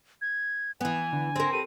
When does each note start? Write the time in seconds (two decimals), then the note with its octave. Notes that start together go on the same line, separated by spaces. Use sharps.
0.21 G#6
0.81 E3 B3 G#5
1.13 D3
1.36 C4 A#4
1.53 G4 A4 B4 D#7